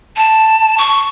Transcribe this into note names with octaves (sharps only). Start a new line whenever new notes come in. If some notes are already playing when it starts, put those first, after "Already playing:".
A5
C#6